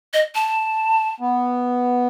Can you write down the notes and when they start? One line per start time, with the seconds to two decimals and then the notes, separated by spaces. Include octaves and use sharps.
0.14 D#5
0.35 A5
1.20 B3